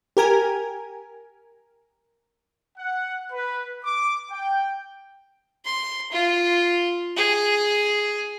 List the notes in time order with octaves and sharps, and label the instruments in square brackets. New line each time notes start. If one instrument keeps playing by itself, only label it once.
[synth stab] G4 A#4 G#5
[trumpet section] F#5
B4
D6
G5
[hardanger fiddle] C6
F4
G#4